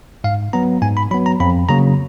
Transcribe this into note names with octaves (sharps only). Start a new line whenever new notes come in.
G#2 F5
F#3 B3 A#5
G#2 G#5
B5
F#3 B3 B5
A#5
F2 B5
C#3 F#3 A#3 A#5